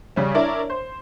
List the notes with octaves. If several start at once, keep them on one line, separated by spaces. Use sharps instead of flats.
C#3 G3 C#4
D4 E4 A#4 C#5 D5 E5
C5